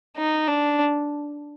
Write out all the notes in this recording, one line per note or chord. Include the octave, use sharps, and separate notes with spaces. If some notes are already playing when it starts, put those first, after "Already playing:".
D#4
D4